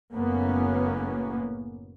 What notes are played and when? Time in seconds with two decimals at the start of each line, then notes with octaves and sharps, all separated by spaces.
0.13 F#1 F#2 A2 A#3 B3 C#4